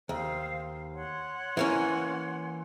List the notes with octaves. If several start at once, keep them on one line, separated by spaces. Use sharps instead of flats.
D#2 C5 F5
C#5 F#5 C6
E3 A#3 C#4